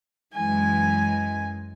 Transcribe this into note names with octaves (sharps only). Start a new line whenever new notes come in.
F#2 E3 G#3 G#5